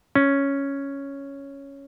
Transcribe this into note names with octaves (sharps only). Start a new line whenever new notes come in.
C#4